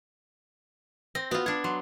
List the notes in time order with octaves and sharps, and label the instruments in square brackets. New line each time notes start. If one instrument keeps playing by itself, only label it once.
[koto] C4 [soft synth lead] A#6
[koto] B3 F4 [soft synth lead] F#4
[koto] D4 F#5 [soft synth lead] G#6
[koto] F#3 [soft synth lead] C6